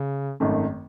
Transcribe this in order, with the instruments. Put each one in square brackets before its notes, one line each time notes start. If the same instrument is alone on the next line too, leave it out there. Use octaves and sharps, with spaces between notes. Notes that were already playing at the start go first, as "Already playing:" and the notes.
Already playing: [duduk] C#3
[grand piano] G#1 F#2 D#3 A3